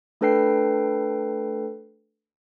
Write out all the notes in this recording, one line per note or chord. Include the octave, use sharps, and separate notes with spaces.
A3 D4 A4 B4 G5 C7